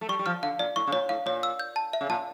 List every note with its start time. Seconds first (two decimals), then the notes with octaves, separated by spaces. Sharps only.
0.01 A3
0.09 G3 C#6
0.19 G3
0.26 F3 F6
0.43 D3 F5
0.59 A#2 D5
0.76 A2 C#6
0.87 C#3
0.93 A#2 C#5
1.09 A2 F5
1.26 A#2 C#5
1.43 E6
1.60 G6
1.76 A5
1.93 E5
2.01 C#3
2.10 A#2 A5